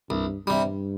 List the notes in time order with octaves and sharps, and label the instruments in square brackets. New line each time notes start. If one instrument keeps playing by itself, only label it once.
[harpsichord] C2 [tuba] G2
[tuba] G2 [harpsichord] C3 G3